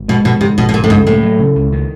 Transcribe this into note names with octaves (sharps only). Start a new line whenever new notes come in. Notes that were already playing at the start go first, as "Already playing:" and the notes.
Already playing: G#1
B2 G#3
B2 D#3
G#2 C3
G#1 B2
B2
A#2 C#3
A2
C#2 G#2
A2 A#3
F#3
C#3
C#2
D#3